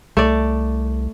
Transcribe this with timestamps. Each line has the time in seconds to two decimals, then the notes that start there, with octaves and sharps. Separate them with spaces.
0.17 C2 A3 D5